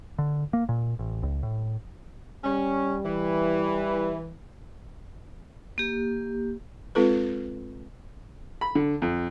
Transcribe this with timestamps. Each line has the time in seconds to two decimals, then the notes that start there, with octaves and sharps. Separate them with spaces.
0.19 D3
0.53 A#3
0.69 A#2
0.99 A1
1.23 C#2
1.43 A2
2.44 G3 C#4
3.05 E3
5.78 A#3 G4
6.95 G#3 C4 F4 A4 B4
8.61 B5
8.75 D3
9.02 F2